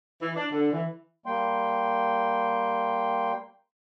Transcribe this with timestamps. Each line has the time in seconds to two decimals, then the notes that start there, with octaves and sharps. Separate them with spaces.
0.22 E3
0.36 D4
0.52 D3
0.73 E3
1.26 G3 A#3 G5 C6